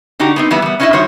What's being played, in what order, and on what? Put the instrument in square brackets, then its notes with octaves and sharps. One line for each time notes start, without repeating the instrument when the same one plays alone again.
[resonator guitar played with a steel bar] D3 D#4 F#4 G4 A#5
B3 C4 D#4
E3 G3 B3 B4 E5
G3 B3
C#4 D#4 E4 F#4 D#5 E5
D#3 G3 F#4 C5 C#5